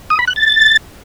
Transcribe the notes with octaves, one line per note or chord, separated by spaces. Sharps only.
D#6
B5
F#6
A6